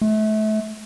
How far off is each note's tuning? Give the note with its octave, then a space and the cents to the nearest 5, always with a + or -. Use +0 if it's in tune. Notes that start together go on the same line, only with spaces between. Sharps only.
A3 -30